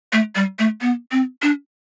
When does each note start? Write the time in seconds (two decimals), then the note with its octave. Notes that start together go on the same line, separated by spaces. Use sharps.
0.13 A3
0.35 G3
0.59 A3
0.81 B3
1.12 C4
1.42 D4